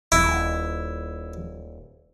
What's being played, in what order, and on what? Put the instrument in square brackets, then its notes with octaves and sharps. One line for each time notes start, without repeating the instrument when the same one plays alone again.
[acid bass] D#1 [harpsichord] E4